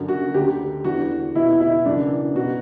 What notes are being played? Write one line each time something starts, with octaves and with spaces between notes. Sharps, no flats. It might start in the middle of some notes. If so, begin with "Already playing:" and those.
Already playing: F#2 D3
F#4
D2 D3 G4
E2 D3 F#4
E2 B2 E4
E4
F#2 C#3 E3 D4
B2 F#4